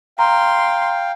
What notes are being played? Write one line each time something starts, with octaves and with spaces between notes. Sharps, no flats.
F5 G5 A#5 C6